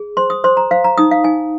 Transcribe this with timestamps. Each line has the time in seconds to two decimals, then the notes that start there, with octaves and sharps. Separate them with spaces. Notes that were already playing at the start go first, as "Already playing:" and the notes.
Already playing: G#4
0.17 C5 C6
0.30 D#6
0.44 C5 C6
0.57 A#5
0.71 C5 F5
0.84 A#5
0.98 D#4 D#6
1.11 F5
1.24 D#4 G#5